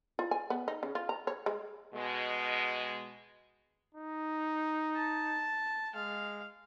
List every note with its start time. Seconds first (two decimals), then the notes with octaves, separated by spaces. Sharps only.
0.19 F4
0.31 G#5
0.50 B3
0.68 D#4
0.83 C#3
0.95 F4
1.09 A#5
1.27 C#5
1.46 G#3
1.94 B2 G#3
3.95 D#4
4.96 A5
5.95 G#3 F5